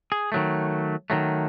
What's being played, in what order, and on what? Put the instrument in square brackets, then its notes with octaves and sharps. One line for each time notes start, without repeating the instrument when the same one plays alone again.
[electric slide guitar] G#4
D#3 F#3 A3
D#3 F#3 A3